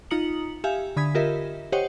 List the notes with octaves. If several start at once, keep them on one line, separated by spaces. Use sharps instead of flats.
D#4 F4 A#5 D#6 C#7 F#7
G4 E5 F5 G#5
D3 B5 D#6 G#6 B6
F4 G4 A#4 D#5 E5
G4 C5 C#5 D#5 F#5 G5